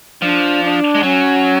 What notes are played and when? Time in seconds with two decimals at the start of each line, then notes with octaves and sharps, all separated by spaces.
0.22 F3 D4
0.63 D4
0.95 G#3
1.03 F#3 C#4